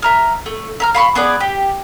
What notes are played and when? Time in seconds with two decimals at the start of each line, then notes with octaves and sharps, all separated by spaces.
0.02 E5 A#5 F6
0.46 A3
0.80 E5 A#5 F6
0.95 F5 B5 C#6
1.15 B3 G#4 B4 D5
1.40 G4